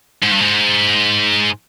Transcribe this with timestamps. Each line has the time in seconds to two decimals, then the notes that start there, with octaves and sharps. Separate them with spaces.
0.23 G#2
0.32 G2
0.41 G#2